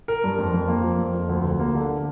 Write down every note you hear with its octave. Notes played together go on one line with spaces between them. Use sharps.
A#4
G2
F2
F2
A#3
F3
F2
F2
D2
D2
A#3
D3